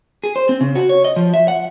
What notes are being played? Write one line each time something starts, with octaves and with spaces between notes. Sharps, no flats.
G#4
C5
C4
C#3
F#4
C#5
D#5
F3
E5
F#5